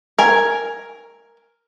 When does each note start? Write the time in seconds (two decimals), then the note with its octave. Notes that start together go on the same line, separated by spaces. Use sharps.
0.19 A#4 G#5